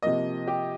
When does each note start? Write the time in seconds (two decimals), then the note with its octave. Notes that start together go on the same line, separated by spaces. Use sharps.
0.02 C3 F3 A#3 D#5
0.47 G4